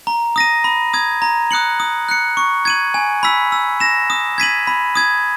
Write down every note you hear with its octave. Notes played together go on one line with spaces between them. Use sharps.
A#5
D#6 A#6 D#7
B5
D#6 G#6
A#5
D#6 F#6 C#7 F#7
D#6
F#6 C#7
C#6
G#6 D#7 F#7
G#5
B5 E6 B6
E6
A#6 E7
D#6
G#6 B6 D#7 F#7
B5
D#6 G#6